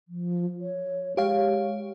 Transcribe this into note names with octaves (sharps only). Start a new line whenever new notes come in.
F3
C#5
G#3 G4 C#5 F5